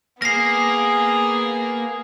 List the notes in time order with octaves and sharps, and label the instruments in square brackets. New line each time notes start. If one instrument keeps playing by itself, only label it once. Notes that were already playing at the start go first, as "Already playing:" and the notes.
[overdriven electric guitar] A#3 [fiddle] B3 G#4 [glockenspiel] A#6 C7